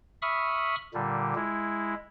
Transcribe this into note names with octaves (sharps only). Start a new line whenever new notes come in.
E5 B5 C#6 D#6 F6
A#2 D3 G3
G#3 E4